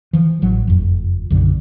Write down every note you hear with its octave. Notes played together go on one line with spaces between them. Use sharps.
E3 F3
A1 F#3
F#1 F2
B1 F#2 D3